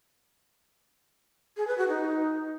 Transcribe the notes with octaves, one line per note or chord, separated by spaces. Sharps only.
G#4
B4
F#4
D#4